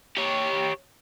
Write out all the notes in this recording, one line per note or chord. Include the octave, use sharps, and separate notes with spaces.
G4 C#5